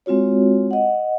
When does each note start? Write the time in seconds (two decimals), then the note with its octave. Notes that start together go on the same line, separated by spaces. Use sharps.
0.06 G#3 C4 F4 F#4 C#5
0.71 D#5 F#5